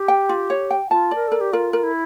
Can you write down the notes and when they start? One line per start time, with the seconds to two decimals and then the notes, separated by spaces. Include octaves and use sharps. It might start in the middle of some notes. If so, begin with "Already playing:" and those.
Already playing: G4
0.08 G5
0.29 F4
0.50 C#5
0.71 G5
0.90 F4 A5
1.11 A#4 D5
1.28 A4 A#4
1.41 G4
1.53 F4 A#4
1.73 A#4
1.83 E4